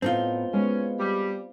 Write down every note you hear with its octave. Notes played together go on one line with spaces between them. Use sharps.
A2 B3 C4 D#4 F4
G#3 B3 C#4 F#4 D#5
G3